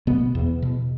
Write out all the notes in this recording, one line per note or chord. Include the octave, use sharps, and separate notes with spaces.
B2 B3
E2
B2